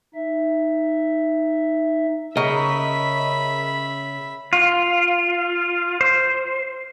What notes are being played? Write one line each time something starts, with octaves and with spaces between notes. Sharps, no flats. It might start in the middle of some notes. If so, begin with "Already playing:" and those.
D#4 E5
C#3 A#4 D#5 E5 B5
F4
C5